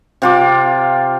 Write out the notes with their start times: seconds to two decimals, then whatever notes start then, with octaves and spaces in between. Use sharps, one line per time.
0.22 C3 F4 D6